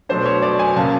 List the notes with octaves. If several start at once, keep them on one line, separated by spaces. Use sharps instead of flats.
B2 F#3 A3 D4 C5
C#5
D5
G#5
C#3 F#3 A#3 C#4 A5